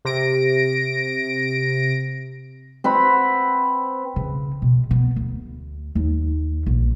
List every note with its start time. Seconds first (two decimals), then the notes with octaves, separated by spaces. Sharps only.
0.05 C3 A#6 D7
2.84 C4 B4 F#5 B5
4.16 C#3
4.62 B2
4.91 B3
5.16 D2
5.95 D#2
6.66 A#1